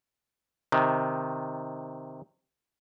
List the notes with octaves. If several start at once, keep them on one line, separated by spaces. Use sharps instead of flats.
C3 D#3